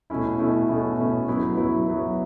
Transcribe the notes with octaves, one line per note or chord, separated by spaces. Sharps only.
B2 A3 C#4 E4
B2 A3 C#4 E4
B2 A3 C#4 E4
B2 A3 C#4 E4
F#3 B3 E4
F#3 B3 E4
F#3 B3 E4